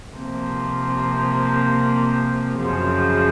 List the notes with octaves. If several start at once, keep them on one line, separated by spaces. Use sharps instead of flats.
C3 F3 A#3
F#2 C#3 F3